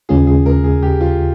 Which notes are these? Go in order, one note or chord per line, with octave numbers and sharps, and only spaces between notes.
D#2 C#3 G#3 C#4 F4 G#4
G#4
A#4
G#4
G4
F4